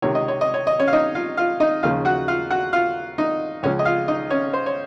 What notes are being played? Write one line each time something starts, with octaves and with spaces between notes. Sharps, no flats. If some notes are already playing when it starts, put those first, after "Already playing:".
C#2 C3 D#3 C#5
D#5
C#5
D#5
C#5
D#5
C#4 C#5
F5
D#4 D#5
F4 F5
F4 F5
D#4 D#5
D#2 C#3 F3 F4 F5
F#4 F#5
F4 F5
F#4 F#5
F4 F5
D#4 D#5
C#2 C#3 F3 C#4 C#5
D#5
F4 F5
D#4 D#5
C#4 C#5
C5
C#5